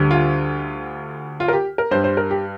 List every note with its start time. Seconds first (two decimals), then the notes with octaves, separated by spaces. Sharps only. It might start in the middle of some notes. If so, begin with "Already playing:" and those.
Already playing: D2 D3 G3
0.11 F4
1.40 F4
1.48 A#4
1.53 G4
1.78 A#4
1.91 G2 G3 C5
2.04 C5
2.17 A#4
2.31 G4